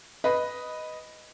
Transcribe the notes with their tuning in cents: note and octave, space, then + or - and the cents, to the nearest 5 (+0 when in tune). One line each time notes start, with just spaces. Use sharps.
B4 +0 D#5 +0